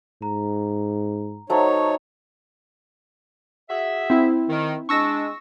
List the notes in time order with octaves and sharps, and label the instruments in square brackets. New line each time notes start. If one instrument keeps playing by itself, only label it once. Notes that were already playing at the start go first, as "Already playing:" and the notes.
[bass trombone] G#2 [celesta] A#5
[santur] F#3 A3 [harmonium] D#4 C#5 [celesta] C5 C#6
[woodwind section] F#4 G#4 E5
[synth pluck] C4 E4
[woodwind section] D#3
[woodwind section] G#3 D4 [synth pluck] C#6 E6 A#6